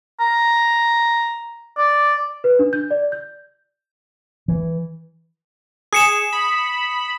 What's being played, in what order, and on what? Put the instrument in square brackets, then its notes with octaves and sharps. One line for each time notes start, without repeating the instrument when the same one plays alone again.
[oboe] A#5
D5
[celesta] B4
D4
G6
D5
G6
[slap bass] E3
[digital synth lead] G#4 [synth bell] D#6 C#7 E7
[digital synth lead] B5